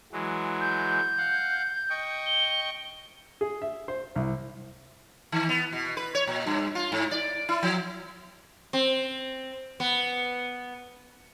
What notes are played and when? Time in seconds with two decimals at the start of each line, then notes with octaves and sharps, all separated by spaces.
0.12 E3 F#3 G#3
0.61 G6
1.18 F5 F#5
1.90 D#5 G5 C#6
2.27 G7
3.41 G#4
3.62 E5
3.88 C5
4.16 C2
5.32 D#3
5.49 B3
5.73 B2
5.97 B4
6.15 C#5
6.27 A#2
6.46 G2
6.75 F4
6.92 G#2
7.11 D5
7.49 E4
7.63 F3
8.73 C4
9.80 B3